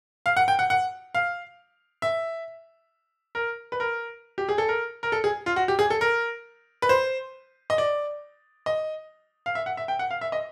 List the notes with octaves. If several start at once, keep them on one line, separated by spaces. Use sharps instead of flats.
F5
F#5
G5
F#5
F#5
F5
E5
A#4
B4
A#4
G4
G#4
A4
A#4
A#4
A4
G#4
F4
F#4
G4
G#4
A4
A#4
B4
C5
D#5
D5
D#5
F5
E5
F#5
E5
G5
F#5
F5
E5
D#5